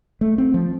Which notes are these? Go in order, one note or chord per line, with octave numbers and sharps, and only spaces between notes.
A3
C4
F3